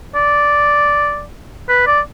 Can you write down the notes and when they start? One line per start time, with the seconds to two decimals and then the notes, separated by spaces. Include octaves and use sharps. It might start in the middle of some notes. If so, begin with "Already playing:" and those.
0.15 D5
1.69 B4
1.87 D5